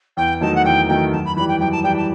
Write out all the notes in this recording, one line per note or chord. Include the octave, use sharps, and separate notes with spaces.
E2 G5
D#3 F#3 A3 D#4 A5
F#5
E2 G5
D#3 F#3 A3 D#4 G5
F#2 A5
B5
E3 G3 B5
G5
F#2 G5
A5
E3 G3 G5
A5